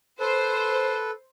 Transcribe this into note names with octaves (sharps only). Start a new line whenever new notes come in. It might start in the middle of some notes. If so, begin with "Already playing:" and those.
A4 B4 C5